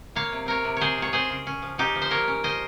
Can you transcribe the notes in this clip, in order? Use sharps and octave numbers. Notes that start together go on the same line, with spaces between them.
A#3 C#5 F5
C3
C4 A#4 C#5
C3
C4 G#4 C5 C#5
D#3 C#5
C4 G#4 C5
C#3
C#4
F3
C#4 D#4 G4
F3
C5
A#3 A#4 C#5
C#4
C#4 C5 D#5